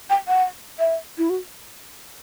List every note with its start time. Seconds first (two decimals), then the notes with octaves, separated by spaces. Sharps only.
0.10 G5
0.28 F#5
0.79 E5
1.18 E4
1.30 F#4